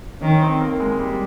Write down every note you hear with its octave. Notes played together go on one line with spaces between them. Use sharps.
D#3 C#4
C4
A#3
G#3
G3